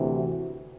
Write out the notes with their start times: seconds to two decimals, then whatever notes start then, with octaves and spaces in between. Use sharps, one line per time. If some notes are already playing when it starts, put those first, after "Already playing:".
Already playing: D2 C3 E3
0.12 F#4